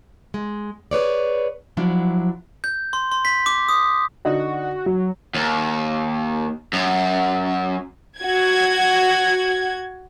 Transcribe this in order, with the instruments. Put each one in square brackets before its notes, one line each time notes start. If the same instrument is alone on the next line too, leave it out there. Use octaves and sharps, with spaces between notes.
[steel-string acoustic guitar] G#3
G#4 B4 C#5 D5
F3 F#3 D4 E4
[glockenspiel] G6
C6
C6
B6
D6
D#6
[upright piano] D3 D#4 D5 [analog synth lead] F#4
[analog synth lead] F#3 [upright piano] F#4
[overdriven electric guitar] D#2
F#2
[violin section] F#4 G#6